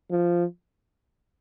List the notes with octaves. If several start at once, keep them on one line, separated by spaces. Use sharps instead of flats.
F3